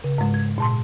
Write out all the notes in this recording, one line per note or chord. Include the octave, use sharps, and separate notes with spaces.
C#3
G#2 G#3
G#6
A#2 A5 C6